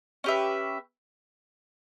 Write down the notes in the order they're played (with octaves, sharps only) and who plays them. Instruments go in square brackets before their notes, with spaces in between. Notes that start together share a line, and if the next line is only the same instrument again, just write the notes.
[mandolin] C#4 G4 B4 E5